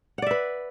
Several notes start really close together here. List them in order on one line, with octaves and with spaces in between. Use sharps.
F#5 D5 E5 B4